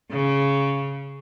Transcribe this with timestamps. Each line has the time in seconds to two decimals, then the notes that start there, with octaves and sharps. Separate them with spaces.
0.11 C#3